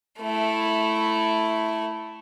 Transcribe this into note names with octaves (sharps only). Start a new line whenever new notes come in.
A3 E4